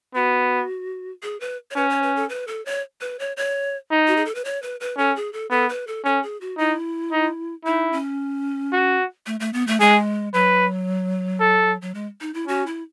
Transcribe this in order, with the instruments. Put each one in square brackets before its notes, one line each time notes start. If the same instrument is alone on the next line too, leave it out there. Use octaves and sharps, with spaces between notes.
[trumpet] B3 [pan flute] F#4
[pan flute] G#4
B4
C#5
[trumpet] C#4 [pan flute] B4
[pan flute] C#5
B4
A4
B4
A4
C#5
B4
C#5
C#5
[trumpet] D#4
[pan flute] F#4
G#4
A4
B4
C#5
B4
B4
[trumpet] C#4 [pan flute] A4
[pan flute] G#4
A4
[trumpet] B3 [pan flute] A4
[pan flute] B4
A4
[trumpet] C#4 [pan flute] A4
[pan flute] G#4
F#4
[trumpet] D#4 [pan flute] E4
[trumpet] D#4
[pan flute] D#4 [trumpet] E4
[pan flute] C#4
[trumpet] F#4
[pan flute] A3
A3
B3
A3
[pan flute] G#3 [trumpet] G#4
[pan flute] F#3 [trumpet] B4
[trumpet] A4
[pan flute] F#3
G#3
D#4
E4
[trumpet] C#4 [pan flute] F#4
[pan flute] E4